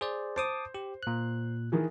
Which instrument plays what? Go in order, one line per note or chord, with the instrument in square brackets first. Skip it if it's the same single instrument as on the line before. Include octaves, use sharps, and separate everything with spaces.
[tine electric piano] G#4 C5 D5
[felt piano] C5 [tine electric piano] A5 D6 D#6
[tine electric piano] G4
A#2 F#6
[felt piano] D#3 E3 G#4